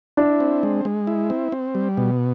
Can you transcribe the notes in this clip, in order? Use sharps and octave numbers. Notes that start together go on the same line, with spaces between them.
D4 E4
C4
G#3
G#3
E4
C4
C4
G3
B2